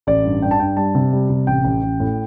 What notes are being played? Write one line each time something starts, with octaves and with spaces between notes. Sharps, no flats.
A1 D5
G2
G2 G5
A5
G2 G5
G3 A5
C3
G3
C3
A1 G5
A1
A1
A2